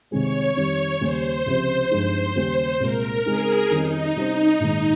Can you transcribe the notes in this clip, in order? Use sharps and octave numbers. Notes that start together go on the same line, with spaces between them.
C2 C3 D#3 G#3 C4 C#5
F2 D#3 G3 C#5
D#2 C#3 G3 C#4 C5
C#2 C3 F3
G1 G2 F3 G#3 D#4 C5
D#2 C#3 G3 C#4 G4
C2 A#2 G#3 A#4
C#3 G#3 C4 D#4 G#4
F2 D#3 G3 C#4 D#4
C3 G3 C#4 G4 C5
A#1 G#2 D#3 G#3